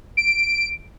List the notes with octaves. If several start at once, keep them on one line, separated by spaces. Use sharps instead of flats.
D7